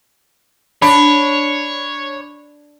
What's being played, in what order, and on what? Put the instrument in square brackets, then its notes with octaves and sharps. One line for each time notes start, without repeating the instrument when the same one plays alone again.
[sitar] D4 [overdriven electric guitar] C#5 [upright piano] B5